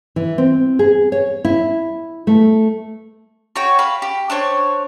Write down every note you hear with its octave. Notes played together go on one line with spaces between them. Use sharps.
E3
C4
G#4
C#5
E4
A3
F#4 C#5 G5
F5 B5
G4
D4 C5 C#5